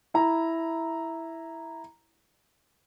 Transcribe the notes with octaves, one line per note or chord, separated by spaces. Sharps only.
E4 A#5